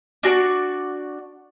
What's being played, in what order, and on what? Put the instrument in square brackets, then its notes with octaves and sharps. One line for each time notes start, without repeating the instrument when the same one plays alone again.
[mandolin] D4 F#4 A4 D5